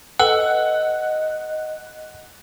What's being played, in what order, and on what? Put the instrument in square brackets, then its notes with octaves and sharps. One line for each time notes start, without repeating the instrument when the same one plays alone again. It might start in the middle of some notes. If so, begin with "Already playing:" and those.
[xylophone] A4 B4 E6 [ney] D#5 [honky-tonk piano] F#5